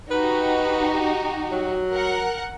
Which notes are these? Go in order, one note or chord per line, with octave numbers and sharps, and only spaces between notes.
D#4 F#4 G4 B4
F#3
A#4 F#5